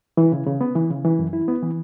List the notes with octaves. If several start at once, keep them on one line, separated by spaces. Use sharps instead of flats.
E3
C#3
C#3
B3
E3
C#3
E3
F#2
E4
B3
E3